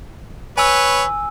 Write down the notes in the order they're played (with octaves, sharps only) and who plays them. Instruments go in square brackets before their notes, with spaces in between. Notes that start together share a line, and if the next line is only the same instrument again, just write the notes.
[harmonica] B4 C#5 [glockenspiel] G#5 E6